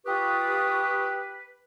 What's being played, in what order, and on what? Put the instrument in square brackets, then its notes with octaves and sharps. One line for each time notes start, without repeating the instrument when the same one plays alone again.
[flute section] F4 C#6 D#6 [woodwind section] G4 B4